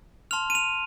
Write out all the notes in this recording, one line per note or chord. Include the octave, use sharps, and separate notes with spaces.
A5 C6 F6 F7
D#7
F7